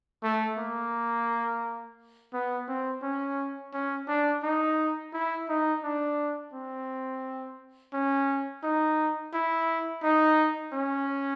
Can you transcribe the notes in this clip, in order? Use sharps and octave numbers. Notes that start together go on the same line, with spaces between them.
A3
A#3
B3
C4
C#4
C#4
D4
D#4
E4
D#4
D4
C4
C#4
D#4
E4
D#4
C#4